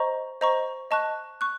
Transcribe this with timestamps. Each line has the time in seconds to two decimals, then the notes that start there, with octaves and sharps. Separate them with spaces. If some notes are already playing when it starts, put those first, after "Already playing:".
Already playing: C5 D#5 A#5 C#6
0.41 C5 D#5 A#5 C#6
0.91 D#5 A5 C#6 F#6
1.41 C#6 F#6